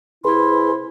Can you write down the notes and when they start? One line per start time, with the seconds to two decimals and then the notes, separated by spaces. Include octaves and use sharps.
0.25 C3 E4 G#4 B4 C6